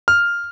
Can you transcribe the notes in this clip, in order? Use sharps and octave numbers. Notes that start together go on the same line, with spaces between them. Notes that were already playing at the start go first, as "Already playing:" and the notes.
F6